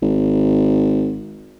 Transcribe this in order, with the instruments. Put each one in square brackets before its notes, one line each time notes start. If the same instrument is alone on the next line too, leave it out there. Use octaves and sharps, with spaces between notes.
[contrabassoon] G#1